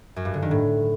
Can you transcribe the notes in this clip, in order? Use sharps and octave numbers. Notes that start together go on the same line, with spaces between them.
F#2
G2
D3
D#3
A2